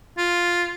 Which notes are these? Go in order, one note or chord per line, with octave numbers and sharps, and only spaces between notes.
F4